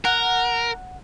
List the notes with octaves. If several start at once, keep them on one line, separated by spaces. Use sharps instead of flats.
A#4 F#5